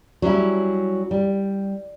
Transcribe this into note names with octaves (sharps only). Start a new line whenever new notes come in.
F#3 G3 C#4 E4
G3